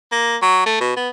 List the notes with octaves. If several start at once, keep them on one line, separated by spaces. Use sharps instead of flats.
A#3
F#3
A3
B2
B3